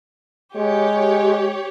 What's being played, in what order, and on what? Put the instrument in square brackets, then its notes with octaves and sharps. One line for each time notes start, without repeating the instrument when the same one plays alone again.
[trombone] G#3 [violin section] G4 C#5